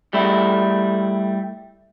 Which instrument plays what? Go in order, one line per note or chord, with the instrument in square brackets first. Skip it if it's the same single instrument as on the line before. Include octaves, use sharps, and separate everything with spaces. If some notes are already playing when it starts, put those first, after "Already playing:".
[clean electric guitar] G3 A3 E4